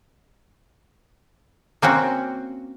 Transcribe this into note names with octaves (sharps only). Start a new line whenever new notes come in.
A#3 C4 C#4 F#4